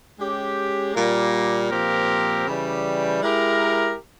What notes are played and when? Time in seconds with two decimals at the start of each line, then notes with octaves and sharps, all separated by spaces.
0.19 G#3 C#4 G4
0.94 A#2 G3 A#3
1.70 A#2 F3 C4 G4 A#4
2.46 C#3 E3 G3
3.22 G#3 E4 G4 A#4